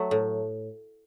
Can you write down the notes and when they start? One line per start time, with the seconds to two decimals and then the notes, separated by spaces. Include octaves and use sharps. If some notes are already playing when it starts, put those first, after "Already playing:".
Already playing: F#3 A3
0.11 A2